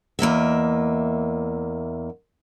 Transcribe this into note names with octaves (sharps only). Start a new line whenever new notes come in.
E2 A#3 D#5 E5